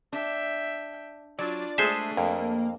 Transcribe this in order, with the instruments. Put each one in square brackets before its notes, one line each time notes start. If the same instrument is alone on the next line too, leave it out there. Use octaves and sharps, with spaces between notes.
[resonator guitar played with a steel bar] D4 [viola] E5 G5
[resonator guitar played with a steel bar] F#3 [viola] D4 F4 [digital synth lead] D5
[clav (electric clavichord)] G#3 C5 E5 [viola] A3 D4 [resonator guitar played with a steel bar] G#4 A4
[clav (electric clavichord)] F2 [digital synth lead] A#3